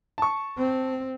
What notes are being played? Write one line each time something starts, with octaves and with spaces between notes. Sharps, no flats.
A5 C#6
C4